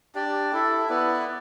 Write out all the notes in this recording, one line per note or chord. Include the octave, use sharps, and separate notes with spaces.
D4 G4 D5
E4 A4 E5
B3 E4 B4 D5